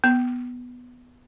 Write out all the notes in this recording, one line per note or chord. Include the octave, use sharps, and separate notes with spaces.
B3